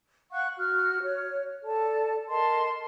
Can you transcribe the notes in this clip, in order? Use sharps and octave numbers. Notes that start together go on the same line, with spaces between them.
F5 F#5 C#6 F#6
F#4 F6 F#6
C#5
A4 D5 A5
A#4 D#5 A5 C6